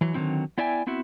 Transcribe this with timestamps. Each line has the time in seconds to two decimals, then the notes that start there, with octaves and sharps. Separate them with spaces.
0.01 E3 F#3
0.14 D3 D#3 F#3 C4 E4
0.58 B3 E4 D5 E5 G5 G#5
0.87 B3 C4 E4 F#4 E5